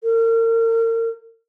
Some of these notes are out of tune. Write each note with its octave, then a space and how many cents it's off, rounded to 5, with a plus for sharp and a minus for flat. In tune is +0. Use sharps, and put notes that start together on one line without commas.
A#4 -35